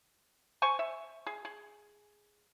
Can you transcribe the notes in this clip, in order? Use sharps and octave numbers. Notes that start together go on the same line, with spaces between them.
C5 G#5 C#6
E5
G#4
G#4